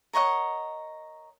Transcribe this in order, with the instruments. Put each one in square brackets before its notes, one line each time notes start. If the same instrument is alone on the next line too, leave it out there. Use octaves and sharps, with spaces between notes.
[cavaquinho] A#4 C#5 D#5 F#5